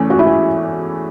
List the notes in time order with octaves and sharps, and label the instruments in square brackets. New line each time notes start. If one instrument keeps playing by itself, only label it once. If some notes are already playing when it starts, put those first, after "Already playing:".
Already playing: [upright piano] E2 E3 A3 C#4
[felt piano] F#4
E4
F#4